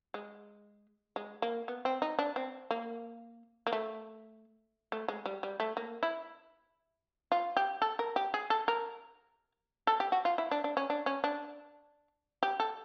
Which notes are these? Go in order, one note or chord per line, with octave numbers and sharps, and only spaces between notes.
G#3
G#3
A#3
B3
C4
D#4
D4
C4
A#3
A#3
A3
A3
G#3
G3
G3
A3
A#3
E4
F4
G4
A4
A#4
G4
G#4
A4
A#4
A4
G4
F#4
F4
E4
D4
D4
C#4
D4
C#4
D4
G4
A4